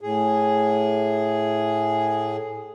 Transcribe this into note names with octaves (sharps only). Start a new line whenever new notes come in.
A2 G#4